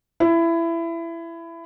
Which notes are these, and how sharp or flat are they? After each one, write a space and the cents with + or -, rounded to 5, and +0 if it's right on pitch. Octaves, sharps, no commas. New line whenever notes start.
E4 +20